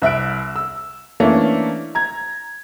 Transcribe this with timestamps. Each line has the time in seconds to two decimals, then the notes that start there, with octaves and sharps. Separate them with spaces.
0.02 C2 E5 F#6 D7
0.56 E6
1.20 E3 A3 A#3 C#4 D4
1.95 A#5 G#6